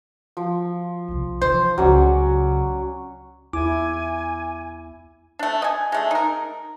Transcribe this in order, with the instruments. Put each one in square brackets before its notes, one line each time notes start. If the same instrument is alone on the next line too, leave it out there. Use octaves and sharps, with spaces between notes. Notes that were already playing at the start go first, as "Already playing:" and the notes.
[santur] F3
[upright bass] B1 C3
[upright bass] E3 F3 [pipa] C5
[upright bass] C#2 C#3 [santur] F#3 C#4 D5
[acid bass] E2 [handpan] E4 [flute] G#5 [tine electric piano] D6
[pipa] A3 D4
D#5 G#5
G#3 A3 D4
D#4 A#4